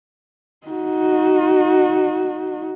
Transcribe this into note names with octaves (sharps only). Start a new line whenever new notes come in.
D#4 F#4